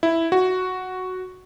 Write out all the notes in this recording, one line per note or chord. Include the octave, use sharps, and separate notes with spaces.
E4
F#4